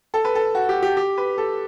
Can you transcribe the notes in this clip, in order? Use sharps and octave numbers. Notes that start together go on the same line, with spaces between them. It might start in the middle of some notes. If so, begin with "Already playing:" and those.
A4
B4
A4
F#4
G4
G4
G4
B4
A4